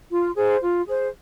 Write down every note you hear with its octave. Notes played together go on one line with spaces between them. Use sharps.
F4
G#4 C5
F4
G#4 C5